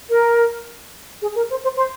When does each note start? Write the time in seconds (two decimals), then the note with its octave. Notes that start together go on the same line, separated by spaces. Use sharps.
0.10 A#4
1.22 G#4
1.36 A#4
1.50 C5
1.63 C5
1.77 C5